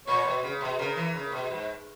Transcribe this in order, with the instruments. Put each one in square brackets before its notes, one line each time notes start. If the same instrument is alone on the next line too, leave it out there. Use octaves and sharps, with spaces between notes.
[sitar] A#2 [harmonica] C#5
[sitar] B2
C#3
B2
[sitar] C#3 [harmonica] A#4
[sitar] E3
C#3
B2
G#2